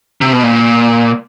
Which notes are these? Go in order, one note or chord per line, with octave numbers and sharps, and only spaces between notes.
C3
B2
A#2